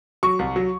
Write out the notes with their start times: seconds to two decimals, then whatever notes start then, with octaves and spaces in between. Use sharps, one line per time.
0.23 F#3 C#6
0.39 C2
0.56 F#3